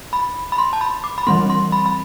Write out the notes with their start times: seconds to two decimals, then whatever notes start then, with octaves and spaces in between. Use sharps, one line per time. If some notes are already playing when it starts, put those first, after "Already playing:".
0.13 B5
0.52 B5
0.58 C6
0.73 A5
0.81 B5
1.04 D6
1.18 B5
1.27 E3 G3 C4 C6
1.50 C6
1.72 B5
1.86 B5